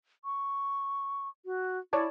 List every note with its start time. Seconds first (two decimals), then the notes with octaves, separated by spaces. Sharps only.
0.25 C#6
1.46 F#4
1.93 E4 C#5 D5 A5